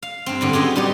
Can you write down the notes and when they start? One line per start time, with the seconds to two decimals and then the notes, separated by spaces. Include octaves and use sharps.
0.02 F5
0.26 G2 C4
0.41 A2 D3 B3
0.53 F#2 G4 G#4 D#5
0.76 G3 B3 D#4 G4